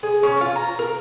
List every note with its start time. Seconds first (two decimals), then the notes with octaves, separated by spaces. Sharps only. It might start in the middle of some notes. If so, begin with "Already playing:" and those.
0.03 G#4
0.23 C#4
0.41 F4
0.56 A#5
0.79 A#4